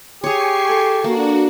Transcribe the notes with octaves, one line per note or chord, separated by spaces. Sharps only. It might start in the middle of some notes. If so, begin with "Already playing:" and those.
G4 G#4 C#5 G#5 C#6 C7
A4
A#3 D4 F#4